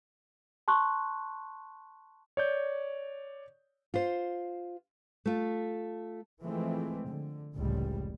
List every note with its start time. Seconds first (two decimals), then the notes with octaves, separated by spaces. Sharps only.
0.68 A5 C6 C#6 F#6
2.37 C#5 D5 G6
3.94 F4 C5
5.25 A3 F4
6.43 E3 F3 G#3 A3 C4
7.07 D3
7.55 F1 C#2 A2 G3